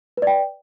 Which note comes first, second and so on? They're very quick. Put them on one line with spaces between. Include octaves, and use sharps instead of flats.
B4 D5 G5